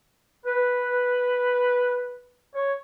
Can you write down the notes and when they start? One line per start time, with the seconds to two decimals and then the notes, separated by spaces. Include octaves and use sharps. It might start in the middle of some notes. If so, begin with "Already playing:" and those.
0.46 B4
2.55 C#5